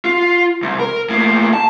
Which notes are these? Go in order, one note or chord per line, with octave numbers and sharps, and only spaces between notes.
F4
C2
A#4
A2 A#3
A5